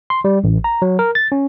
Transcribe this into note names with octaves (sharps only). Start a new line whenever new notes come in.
C6
G3
A1
A#5
F#3
A#4
A6
C#4